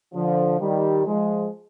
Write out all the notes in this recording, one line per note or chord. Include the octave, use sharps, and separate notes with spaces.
D3 F3
D#3 G3
F3 G#3